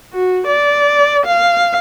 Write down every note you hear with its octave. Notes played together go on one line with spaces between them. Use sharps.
F#4
D5
F5